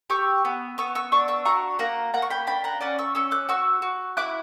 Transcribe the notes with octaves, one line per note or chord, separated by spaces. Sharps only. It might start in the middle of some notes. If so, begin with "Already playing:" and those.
G4 C#6 E6
B3
B3 C#6 E6
C#6 E6
D4 C#6 E6
C#6 E6
F#4 A#5 C#6
A#3 F#5 A#5
A#3 F#5 A#5
C#6
G5 B5
D4 G5 B5
F#5 A#5
C#4 D5 F#5
C#6 E6
C#4 C#6 E6
D6 F#6
F#4 C#6 E6
F#4
E4 D6 F#6